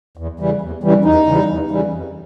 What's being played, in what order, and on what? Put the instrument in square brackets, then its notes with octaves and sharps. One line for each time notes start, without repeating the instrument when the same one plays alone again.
[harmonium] E2
C#3 E3 G3
E2
C#3 E3 G3
E2 D#4
C#3 E3 G3
E2
C#3 E3 G3
F2